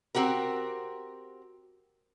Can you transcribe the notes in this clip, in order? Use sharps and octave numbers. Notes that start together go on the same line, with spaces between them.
C4 F#4 G4 A#4